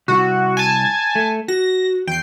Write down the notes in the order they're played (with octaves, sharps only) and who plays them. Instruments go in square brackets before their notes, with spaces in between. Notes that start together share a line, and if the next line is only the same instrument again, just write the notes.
[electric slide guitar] C3 G3 E4 [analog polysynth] F#4
[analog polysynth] G#5 A5
[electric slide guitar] A3
[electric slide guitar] F#4 [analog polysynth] A#6
[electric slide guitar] E2 [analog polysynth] G5 C7